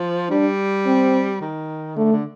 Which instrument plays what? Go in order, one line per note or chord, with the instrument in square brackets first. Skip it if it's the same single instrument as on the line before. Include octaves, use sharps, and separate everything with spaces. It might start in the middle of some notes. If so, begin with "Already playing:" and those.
Already playing: [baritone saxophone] F3
[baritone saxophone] G3 [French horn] D4
[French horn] C4
[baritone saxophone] D#3
[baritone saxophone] D3 [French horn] A3
[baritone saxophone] D3